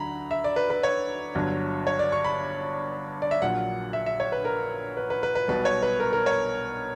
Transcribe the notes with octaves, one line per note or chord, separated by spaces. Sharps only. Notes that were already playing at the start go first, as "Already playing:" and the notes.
Already playing: D2 D3 F#3 A#5 B5
E5
D5
B4
B4
C#5
G1 G2 F#3
C#5
D5
C#6
B5
D5
E5
A#1 A#2 F#3 F#5
E5
E5
C#5
B4
A#4
B4
B4
B4
B4
B1 B2 G3 B4
C#5
B4
A#4
A#4
C#5